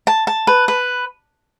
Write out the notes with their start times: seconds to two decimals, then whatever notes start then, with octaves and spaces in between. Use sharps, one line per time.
0.07 A5
0.27 A5
0.47 B4
0.68 B4